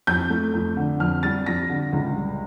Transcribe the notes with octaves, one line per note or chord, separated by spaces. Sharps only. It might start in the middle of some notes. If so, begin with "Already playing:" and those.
F2 G6
A3
F2
D3
F2 F6
G3 A6
F2 A#6
D3
C#2
G3